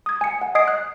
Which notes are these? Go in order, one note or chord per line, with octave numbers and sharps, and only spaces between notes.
D#6 G#6
G#5 C#7
F#5 G#5
D#5 D#6 G#6 C7 D7
F#6